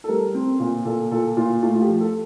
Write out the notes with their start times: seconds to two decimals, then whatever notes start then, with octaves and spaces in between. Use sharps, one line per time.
0.04 A4
0.08 G3 A#4
0.35 C4
0.60 A#2
0.85 A#2 A4
1.11 A#2 A4
1.37 A#2 F4
1.62 A3 F4
1.75 F4
1.81 G4
1.88 F3
2.00 A4